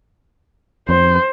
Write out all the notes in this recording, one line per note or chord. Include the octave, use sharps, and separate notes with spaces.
F2 C5